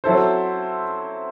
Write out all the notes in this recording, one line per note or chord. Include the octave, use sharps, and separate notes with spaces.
F#3 C4 E4 A4 C5